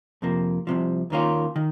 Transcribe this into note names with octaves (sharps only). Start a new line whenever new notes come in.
F2 C3 F3 A#3
C2 C3 F3
D#2 D#3 A#3 C#4 F4
D#3